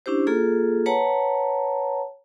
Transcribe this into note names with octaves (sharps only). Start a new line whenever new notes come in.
C#4 D4 E4 G4 C5
A#3 F4 G#4 A4
B4 C#5 F#5 A5 A#5